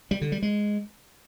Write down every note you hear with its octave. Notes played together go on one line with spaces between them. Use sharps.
G3
D3
G3
G#3